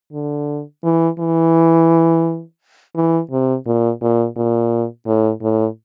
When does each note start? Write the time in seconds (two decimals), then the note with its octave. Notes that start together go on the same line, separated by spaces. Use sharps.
0.13 D3
0.84 E3
1.19 E3
2.96 E3
3.31 C3
3.66 A#2
4.02 A#2
4.37 A#2
5.07 A2
5.42 A2